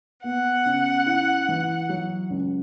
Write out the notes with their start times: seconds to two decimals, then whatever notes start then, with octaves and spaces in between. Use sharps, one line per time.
0.24 B3 F#5
0.66 C#3
1.06 E4
1.49 E3
1.89 F#3
2.30 C#2